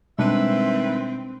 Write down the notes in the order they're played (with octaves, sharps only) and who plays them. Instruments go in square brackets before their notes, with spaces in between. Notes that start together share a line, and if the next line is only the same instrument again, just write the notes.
[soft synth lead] B2 [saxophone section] D#3 B4 E5 [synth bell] G3 G#3 D4 [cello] C4